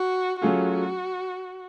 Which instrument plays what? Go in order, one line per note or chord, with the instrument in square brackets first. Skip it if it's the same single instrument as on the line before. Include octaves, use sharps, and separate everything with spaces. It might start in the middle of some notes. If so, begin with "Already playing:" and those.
Already playing: [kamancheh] F#4
[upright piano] F#3 A3 C#4 F4 G#4 [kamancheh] F#4